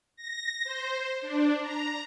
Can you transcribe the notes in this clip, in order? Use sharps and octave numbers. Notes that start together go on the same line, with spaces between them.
A#6
C5
D4
A#5